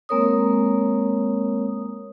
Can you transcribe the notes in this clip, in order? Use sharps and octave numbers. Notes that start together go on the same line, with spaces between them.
G#3 A#3 C4 A#4 C#5 D#6